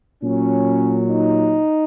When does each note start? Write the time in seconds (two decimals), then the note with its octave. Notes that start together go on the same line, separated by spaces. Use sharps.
0.22 A#2 F#3 C#4
1.09 D#4